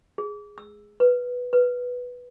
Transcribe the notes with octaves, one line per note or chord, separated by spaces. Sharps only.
G#4
E6
B4
B4